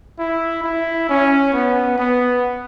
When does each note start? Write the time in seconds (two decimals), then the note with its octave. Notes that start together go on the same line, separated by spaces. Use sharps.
0.19 E4
0.64 E4
1.09 C#4
1.53 B3
1.98 B3